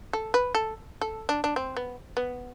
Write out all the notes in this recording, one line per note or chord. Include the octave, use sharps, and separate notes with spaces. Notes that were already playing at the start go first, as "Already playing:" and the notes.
A4
B4
A4
A4
D4
D4
C4
B3
B3